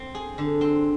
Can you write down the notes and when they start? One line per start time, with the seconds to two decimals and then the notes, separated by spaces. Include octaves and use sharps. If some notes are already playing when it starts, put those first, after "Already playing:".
Already playing: C4
0.15 G#4
0.38 D3
0.61 C4